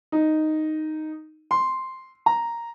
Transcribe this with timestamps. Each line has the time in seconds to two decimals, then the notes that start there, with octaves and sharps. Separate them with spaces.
0.12 D#4
1.51 C6
2.26 A#5